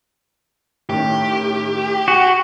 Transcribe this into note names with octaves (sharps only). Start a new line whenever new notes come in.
A2 D#3 C#4 G4
F#4 F#5